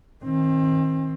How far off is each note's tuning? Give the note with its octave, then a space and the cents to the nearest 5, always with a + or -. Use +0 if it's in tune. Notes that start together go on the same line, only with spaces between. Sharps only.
D#3 +30 C4 +35